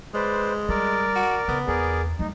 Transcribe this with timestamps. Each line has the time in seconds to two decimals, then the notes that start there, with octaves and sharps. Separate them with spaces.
0.14 G#3 B4 C5 D5
0.69 G3 A#4 D5
1.16 F#4
1.48 C#3 B3
1.68 E2 G#4 A#4 D5
2.19 G3 A3 D#4